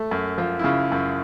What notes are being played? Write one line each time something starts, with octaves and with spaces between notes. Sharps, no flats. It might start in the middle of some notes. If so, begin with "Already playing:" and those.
Already playing: A3
F#2
F3 F4
E4
C#3 F4
F#2